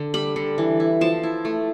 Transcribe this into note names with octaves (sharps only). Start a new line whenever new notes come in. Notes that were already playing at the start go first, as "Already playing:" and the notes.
Already playing: D3
G3 B5
D3
E3
E4
F3 A5
E4
A3